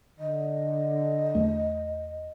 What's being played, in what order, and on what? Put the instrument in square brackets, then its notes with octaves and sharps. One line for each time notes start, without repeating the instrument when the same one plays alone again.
[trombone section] D3 [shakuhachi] D#5
[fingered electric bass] E2 A3